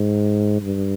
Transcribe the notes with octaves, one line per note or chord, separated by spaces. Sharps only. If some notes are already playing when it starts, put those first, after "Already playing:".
Already playing: G#2
G2